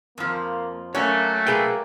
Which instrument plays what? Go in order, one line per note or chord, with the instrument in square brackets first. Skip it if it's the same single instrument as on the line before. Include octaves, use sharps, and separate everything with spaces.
[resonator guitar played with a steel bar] F2 F3 [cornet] A#3
[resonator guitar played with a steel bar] F#3 C#4 [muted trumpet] A3 [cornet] A#3 [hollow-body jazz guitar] C#5
[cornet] A#3 [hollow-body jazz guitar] G#4 B4 G5